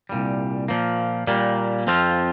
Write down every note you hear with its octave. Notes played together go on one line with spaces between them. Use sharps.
C2 A#2 G3
A#2 F3 A#3
A#2 G3 A#3
F2 F3 C4 F4